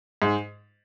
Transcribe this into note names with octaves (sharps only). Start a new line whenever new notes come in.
G#2